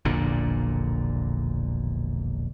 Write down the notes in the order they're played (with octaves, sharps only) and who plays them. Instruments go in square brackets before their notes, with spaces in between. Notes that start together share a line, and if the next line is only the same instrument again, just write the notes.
[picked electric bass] E1 A#1 A#2 D3